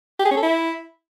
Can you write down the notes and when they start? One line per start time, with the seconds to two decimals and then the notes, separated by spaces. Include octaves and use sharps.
0.19 G4
0.25 G#4
0.31 C#4
0.37 A4
0.43 E4